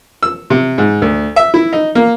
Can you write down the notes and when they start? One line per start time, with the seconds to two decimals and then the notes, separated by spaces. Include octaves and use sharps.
0.23 E6
0.50 C3
0.78 G#2
1.02 D2
1.36 E5
1.54 E4
1.73 D#4
1.95 A#3